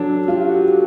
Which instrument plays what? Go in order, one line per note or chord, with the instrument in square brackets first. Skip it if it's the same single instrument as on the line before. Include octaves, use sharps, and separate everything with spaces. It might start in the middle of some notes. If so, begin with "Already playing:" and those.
Already playing: [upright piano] F#3 D4 [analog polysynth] A4
[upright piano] F4 [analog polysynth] G4
[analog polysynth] F#4